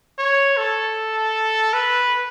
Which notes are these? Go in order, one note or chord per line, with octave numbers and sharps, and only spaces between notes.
C#5
A4
B4